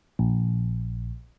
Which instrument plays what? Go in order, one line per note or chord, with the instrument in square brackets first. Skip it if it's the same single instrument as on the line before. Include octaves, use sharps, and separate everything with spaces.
[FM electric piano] A#1